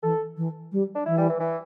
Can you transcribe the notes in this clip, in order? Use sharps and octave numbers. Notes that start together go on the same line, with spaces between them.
E3 A4
E3
G3
D4
E3 E4
G3
E3
E3